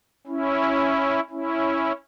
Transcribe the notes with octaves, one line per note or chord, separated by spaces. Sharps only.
C#4 E4
C#4 E4